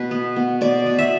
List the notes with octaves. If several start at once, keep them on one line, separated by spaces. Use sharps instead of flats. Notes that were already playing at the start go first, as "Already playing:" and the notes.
Already playing: B2 B4
B3
B3
B2 D5
B2
E5